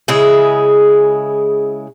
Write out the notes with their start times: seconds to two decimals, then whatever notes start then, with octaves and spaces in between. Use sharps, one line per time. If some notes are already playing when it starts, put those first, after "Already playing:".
0.08 C#3 G#3 E4 G#4